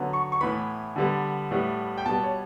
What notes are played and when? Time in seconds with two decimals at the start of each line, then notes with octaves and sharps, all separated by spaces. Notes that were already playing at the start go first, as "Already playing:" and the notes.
Already playing: D3 F#3 B3
0.13 C#6
0.32 C#6
0.41 A2 E3 B3 B5
0.96 D3 G3 B3
1.51 A2 G3 B3
1.98 G5
2.06 B2 G3 B3 A5
2.23 C#5